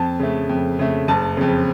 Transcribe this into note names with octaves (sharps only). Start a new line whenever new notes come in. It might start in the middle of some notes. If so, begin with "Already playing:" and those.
Already playing: F2 A5
C#3 A3
F2
C#3 A3
F#1 A5
F2 C#3